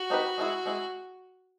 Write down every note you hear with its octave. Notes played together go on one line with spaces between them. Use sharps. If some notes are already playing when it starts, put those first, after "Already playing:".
Already playing: F#4
C4 D#4 G4 B4
G#3 C4 E4 G#4
G#3 C4 E4 G#4